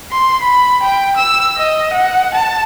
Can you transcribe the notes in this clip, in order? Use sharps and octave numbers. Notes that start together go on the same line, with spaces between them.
C6
B5
G5
E6
D#5
F#5
A5